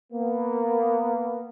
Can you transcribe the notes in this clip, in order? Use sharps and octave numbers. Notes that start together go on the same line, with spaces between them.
A#3 B3